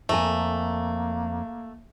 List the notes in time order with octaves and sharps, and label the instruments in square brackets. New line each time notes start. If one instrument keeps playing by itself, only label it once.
[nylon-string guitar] F2 A#4 G#5 [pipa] A3 [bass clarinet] A#3